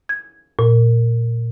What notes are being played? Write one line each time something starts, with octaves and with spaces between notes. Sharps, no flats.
G#6
A#2